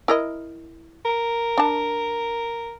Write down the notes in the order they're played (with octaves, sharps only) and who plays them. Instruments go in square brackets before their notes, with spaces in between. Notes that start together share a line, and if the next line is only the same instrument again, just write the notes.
[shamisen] E4 A#4 D#5
[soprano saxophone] A#4
[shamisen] D4 A5